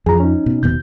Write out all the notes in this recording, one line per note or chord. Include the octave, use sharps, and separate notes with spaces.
F2 F3 G#4 A#5
C#4 D#4
B2
D#1 D#2 B2 G6